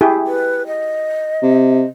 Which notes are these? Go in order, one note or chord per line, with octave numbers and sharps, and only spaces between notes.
E4 G4 G#4
B4
D#5
C3